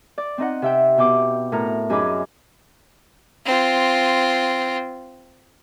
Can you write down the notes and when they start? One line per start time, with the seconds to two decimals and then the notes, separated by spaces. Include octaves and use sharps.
0.18 D5
0.38 C4 D#4 D#5 F#5
0.62 C3 E5 G5
0.98 B2 G5 D6
1.52 A2 A#4 A#5
1.90 F#2 D#4 G#4 D#5 B5 D6
3.46 C4 F4